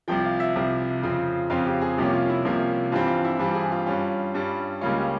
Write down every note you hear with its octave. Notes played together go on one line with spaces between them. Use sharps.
C2 C3 F3 G5
F5
E5
C2 C3 F3
F2 C#3 F3 C4
F2 C#3 F3 C4 F5
G4
G#4
C2 C3 F3 A#3 C#4 G4
F4
E4
C2 C3 F3 A#3 C#4
G2 E3 G3 C4 F4
F4
E4
G2 E3 G3 C4 F4
G#4
F4
G2 G3 C#4
G2 G3 C#4
C#2 C#3 G3 A#3 C#4 F4
G4